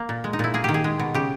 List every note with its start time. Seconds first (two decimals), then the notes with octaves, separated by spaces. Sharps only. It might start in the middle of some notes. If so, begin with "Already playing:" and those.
Already playing: A#3
0.09 A#2
0.24 G#3
0.33 D#4
0.39 A#2 E4
0.54 A#3 G#4
0.64 D#3 G4
0.74 G#4
0.84 G#3
0.99 B2
1.14 C#3 G4